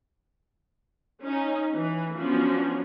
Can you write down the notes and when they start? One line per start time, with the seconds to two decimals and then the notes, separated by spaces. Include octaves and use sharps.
1.23 C#4 D#4
1.75 E3
2.18 F3 F#3 B3 C#4 D4